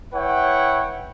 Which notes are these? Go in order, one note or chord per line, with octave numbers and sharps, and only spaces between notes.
E4 B4 C#5 F#5 G5